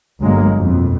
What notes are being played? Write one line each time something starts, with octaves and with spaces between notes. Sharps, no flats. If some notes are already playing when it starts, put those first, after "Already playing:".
G1 F#3 G#3 A#3
F2 B2